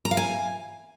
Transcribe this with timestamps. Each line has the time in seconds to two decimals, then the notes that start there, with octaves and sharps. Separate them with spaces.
0.05 A#5
0.11 F5
0.17 G#5